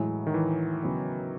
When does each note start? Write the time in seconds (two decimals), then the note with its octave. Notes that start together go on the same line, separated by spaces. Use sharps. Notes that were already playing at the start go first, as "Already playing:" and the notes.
Already playing: A2 E3 F#3 G#3
0.27 D#3
0.34 E3
0.83 C#3 F#3 B3